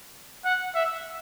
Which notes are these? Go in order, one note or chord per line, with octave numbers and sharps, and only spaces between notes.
F#5
E5